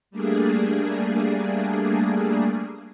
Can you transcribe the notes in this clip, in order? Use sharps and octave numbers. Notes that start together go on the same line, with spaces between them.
G3 A3 A#3 D4 G#4